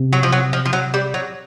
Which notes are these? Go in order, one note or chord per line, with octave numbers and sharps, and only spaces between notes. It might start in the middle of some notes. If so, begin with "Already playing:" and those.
Already playing: C3
F#3
F3
F#3
F3
F3
F#3
G3
F#3